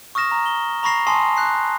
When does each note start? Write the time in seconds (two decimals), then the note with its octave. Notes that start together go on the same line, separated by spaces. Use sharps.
0.15 C#6 D#6 F6 A#6 E7
0.31 A#5
0.46 G7
0.83 A#5 B5 C#6 A#6 C7 F7
1.07 G#5 A5 C6 D#6 C7
1.37 F#6 C7